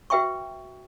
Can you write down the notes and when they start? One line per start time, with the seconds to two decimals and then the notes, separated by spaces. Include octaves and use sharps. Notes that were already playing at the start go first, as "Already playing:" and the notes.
0.10 F#4 B4 E5 G5 C6 C#6